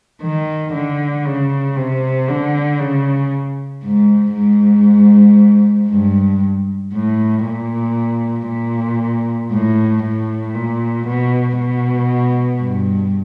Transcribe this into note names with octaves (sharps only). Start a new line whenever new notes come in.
D#3
D3
C#3
C3
D3
C#3
G#2
G#2
G2
A2
A#2
A#2
A2
A2
A#2
B2
B2
G2